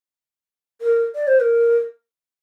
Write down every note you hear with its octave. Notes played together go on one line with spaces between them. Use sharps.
A#4
D5
C5
A#4